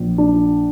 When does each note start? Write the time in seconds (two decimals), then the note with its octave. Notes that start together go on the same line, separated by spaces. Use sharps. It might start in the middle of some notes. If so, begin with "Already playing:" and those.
Already playing: A#1
0.18 D4